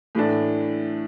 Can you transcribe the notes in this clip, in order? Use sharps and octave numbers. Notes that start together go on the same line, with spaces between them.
A2 E3 A3 D4